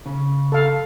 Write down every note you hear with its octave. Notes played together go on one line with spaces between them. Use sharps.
C#3
A4 F5